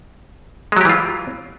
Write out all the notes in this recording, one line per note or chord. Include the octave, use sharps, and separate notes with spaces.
E3 F#3 G#3 F4 G4